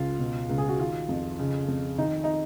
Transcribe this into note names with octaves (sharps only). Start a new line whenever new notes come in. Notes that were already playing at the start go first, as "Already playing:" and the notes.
Already playing: C#2 F4
B2
C#2
G#4
F#4
D#3 F4
F2
C#3
F2
D#3 D#4
D#4